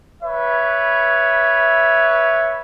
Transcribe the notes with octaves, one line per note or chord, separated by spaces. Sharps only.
B4 C#5 E5